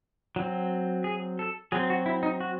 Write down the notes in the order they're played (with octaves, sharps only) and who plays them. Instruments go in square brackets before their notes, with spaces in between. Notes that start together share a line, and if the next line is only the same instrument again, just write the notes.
[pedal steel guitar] F#3 C4
G#4
A4
F#3 C4 G#4
F#4
E4
D#4
F#4